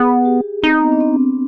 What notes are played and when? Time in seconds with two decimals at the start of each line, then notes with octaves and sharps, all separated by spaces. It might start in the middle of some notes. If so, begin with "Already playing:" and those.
Already playing: B3 G#4
0.25 G4
0.63 C4 D#4
0.81 B3
0.92 D4
1.00 C4